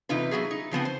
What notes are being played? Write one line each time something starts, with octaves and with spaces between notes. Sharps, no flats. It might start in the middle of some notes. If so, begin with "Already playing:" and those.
E2 C3 D#4 F4 B4
F#3 B3 F#4 G#4
D#4
C#3 F3 B3 C4
C5